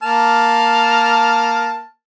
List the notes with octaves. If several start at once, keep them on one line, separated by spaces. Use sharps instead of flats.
A#3 A5 F6